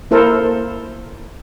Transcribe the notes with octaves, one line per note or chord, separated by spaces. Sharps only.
A#3 E4 A4 A#4 C5